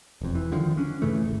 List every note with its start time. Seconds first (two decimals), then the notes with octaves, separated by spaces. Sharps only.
0.21 E1 F2
0.35 E3
0.52 D3 D#3 F3
0.77 C#4 D4
1.02 G2 C#3 E3 A3
1.24 D#1 G#1